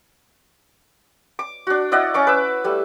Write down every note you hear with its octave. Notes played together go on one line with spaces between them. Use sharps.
D6
D4 F#4
E4 D5 D#5 F#5
C#4 C#6 D6
B4 D6 E6
G3 A3